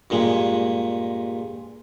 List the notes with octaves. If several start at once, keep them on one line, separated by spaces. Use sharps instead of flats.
G2 A#2 G#3